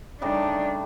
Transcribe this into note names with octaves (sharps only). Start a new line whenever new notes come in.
C#3 G3 A3 D4 D#4